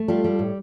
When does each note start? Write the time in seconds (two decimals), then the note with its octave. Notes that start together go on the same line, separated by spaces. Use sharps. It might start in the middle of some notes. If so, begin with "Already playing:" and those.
Already playing: A3
0.08 G3 F4 A4
0.24 G3
0.39 A2